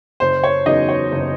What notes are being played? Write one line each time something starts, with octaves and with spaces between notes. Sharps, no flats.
F#1 C5
C#5
E2 C#3 F#3 D#4 D#5
C#5
F#1